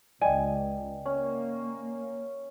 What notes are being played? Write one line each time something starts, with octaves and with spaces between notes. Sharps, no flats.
C#2 D5 D#5 G5 G#5
A#3 C#4